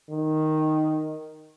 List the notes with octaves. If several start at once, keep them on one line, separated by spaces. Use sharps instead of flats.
D#3